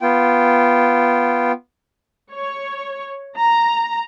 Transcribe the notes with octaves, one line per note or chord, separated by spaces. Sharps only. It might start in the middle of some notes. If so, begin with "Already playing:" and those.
B3 F4 G5
C#5
A#5